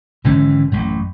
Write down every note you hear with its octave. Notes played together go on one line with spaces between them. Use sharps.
G#1 D3 E3 C#4
A1 F#2